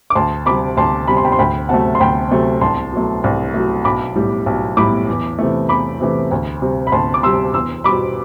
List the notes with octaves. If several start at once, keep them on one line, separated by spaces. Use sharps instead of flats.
D6
D2 A5 C6
C3 G3 B5 D6
D2 A5 C6
C3 G3 B5
C6
G5 B5
C6
D2 G5 B5
C3 F#3 A3 F#5 A5
C6
D2 G5 B5
C3 F#3 A3
C2 A5 C6
B2 F#3 A3
C2
B2 F#3 A3
B1 B5 D6
A2 G3
B1
A2 G3 B5 D6
E2
C3 E3 A3
E2 B5 D6
C3 E3 A3
D2
C3 G3
B5
D2 A5 C6
D6
C3 G3 C6 E6
E2 C6 E6
B2 G3 B5 D6